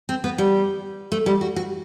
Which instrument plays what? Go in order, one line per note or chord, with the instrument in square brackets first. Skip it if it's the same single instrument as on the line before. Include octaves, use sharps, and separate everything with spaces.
[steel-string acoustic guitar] C4
B3
G3
A3
G3
F#4
F#4